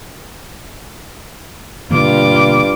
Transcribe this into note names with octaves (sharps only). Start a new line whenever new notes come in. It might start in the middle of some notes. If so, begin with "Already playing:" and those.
G2 B2 D3 A#3 F4 D6